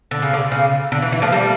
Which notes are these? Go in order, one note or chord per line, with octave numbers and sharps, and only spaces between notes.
D3
C#3
D3
C#3
D3
E3
E3
F3 A3
G3 A#3